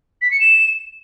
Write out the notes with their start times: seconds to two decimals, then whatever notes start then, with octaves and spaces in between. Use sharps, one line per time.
0.22 B6
0.31 C#7
0.40 E7